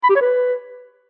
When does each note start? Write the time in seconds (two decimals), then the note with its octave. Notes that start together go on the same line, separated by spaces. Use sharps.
0.04 B5
0.10 G4
0.15 C#5
0.21 B4